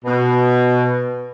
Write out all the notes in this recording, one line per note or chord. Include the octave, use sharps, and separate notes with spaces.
B2